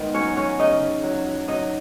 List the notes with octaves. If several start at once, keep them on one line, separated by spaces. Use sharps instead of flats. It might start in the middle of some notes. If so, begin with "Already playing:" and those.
Already playing: G#2 D#3 B3 B4
F#3 C#4 C#5
F#3 C#4 C#5
C#3 D#4 D#5
C#3
F#3
F#3
F#3 D#4 D#5